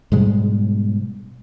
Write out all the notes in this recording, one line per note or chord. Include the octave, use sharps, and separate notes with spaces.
G#2 B2 G3 G#3